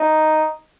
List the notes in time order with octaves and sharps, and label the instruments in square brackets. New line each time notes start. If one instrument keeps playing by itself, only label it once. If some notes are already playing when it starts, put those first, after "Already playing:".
Already playing: [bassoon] D#4